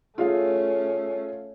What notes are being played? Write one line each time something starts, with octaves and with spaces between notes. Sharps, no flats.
A3 C#4 F4 G#4 F5